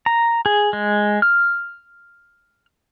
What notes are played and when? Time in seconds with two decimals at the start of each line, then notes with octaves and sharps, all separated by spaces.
0.06 A#5
0.46 G#4
0.73 G#3
1.22 F6